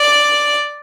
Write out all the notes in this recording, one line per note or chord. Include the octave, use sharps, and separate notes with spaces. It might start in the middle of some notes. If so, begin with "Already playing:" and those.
Already playing: D5